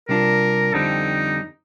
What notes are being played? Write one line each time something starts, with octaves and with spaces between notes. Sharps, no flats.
C3 G3 D4 F4 A#4
F2 D3 G3 C4 D#4